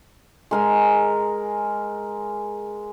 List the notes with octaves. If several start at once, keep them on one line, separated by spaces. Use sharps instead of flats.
G#3 A#4 G#5